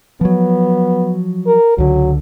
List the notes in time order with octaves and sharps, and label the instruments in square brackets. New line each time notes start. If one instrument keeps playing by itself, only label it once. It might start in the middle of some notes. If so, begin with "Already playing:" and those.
[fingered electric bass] F3 F#3 [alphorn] B3
[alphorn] A#4
[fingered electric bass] C#2 D3 [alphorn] F#3